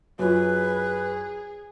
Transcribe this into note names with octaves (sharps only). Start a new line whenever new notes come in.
F#2 F4 F#4 G#4 B4